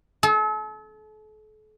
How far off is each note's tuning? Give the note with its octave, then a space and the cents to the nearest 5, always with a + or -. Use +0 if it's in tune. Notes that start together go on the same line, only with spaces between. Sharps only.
A4 -40